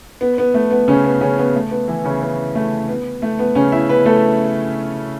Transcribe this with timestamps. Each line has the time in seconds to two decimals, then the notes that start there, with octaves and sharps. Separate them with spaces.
0.21 B3
0.38 B3
0.54 A3
0.71 B3
0.88 C#3 C#4
1.04 B3
1.21 C#3 C#4
1.38 B3
1.55 A3
1.71 B3
1.88 E3 E4
2.05 C#3 C#4
2.22 B3
2.55 A3
2.89 B3
3.22 A3
3.39 B3
3.55 C#3 C#4
3.72 E4 E5
3.89 B3 B4
4.06 A3 A4